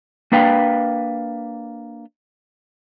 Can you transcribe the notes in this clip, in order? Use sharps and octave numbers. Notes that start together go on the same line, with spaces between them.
A#3 D4 B4 F5 G5